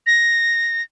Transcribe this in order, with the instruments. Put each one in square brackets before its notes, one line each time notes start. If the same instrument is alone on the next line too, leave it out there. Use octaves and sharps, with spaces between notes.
[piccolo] A#6